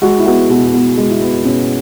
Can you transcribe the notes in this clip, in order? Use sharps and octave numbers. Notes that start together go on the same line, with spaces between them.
G#3 F#4
E4
B3 F#4
B2 F#4
G#4
B2 F#4
G#3
E4
B3
B2 C#4